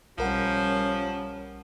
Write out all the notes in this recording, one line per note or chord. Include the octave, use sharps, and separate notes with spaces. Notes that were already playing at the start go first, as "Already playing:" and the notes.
B1 F3 G3 C#4 A#4 F#5